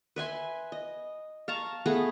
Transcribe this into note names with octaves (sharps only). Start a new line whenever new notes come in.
B4 E5 G#5 C6
D#5
F5 A5 A#5 C#6
A3 B3 G#4 B4